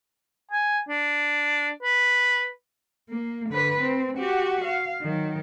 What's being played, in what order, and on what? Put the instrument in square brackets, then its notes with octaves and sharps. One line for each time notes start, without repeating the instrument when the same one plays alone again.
[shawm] G#5
D4
B4
[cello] A#3
D3 B4
C4
F#4 G4
F5
D#3 F#3